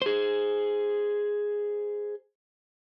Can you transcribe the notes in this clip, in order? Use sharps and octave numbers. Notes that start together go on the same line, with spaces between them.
G#4 C5